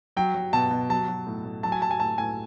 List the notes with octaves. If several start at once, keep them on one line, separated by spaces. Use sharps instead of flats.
F#3 G5
F#3
B2 A5
B2
F#3 A5
F#3
A2
A2
F#3 A5
G#5
F#3 A5
G#5
A2 A5
A2 G#5